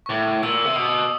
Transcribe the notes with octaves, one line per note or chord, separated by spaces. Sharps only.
C#6
A2 D6
A#2 E6
C3
B2 D#6